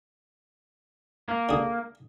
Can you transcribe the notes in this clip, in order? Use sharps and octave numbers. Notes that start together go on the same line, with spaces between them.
A#3
D3 G#4